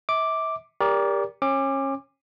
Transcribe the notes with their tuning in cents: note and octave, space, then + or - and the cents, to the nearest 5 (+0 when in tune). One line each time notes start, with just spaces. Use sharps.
E5 -35 D6 +0
G4 +25 A#4 +15 D5 -25
C#4 -30 D6 +15